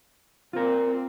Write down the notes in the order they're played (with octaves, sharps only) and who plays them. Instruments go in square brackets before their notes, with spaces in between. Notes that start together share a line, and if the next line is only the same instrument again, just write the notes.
[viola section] C4 [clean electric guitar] F4 A#4